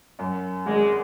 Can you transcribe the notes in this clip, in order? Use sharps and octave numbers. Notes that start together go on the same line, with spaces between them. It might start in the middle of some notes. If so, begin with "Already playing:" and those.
F#2
G#1 G#3